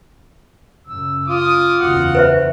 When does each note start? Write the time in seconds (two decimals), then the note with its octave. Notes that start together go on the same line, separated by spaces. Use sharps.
0.87 F#2 C#3 E6
1.28 F4 D6 D#6
1.80 F#1 E2 F#4 F#5
2.15 B4 C5 E5